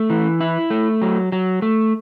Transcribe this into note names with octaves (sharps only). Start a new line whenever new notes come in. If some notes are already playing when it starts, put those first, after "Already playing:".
Already playing: A3
E3
E4
A3
F#3
F#3
A3